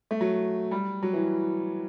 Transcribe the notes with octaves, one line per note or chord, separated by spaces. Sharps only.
A3
F#3
G3
F#3
E3